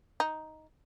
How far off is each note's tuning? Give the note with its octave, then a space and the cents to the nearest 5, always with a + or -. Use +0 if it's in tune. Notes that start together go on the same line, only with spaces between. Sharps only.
D#4 +5